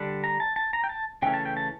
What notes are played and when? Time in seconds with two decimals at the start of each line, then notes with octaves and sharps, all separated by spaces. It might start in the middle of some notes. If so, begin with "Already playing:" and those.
Already playing: D3 G3 D4
0.24 A#5
0.40 A5
0.56 A5
0.73 A#5
0.84 G5
0.89 A5
1.22 C#3 E3 A3 C#4 G5
1.34 A5
1.46 G5
1.57 A5